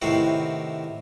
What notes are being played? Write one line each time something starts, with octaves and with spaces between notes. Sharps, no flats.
A2 C3 D#3 C4 E4 F#4